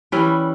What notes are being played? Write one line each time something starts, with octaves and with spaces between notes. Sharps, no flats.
E3 G3 C#4 E4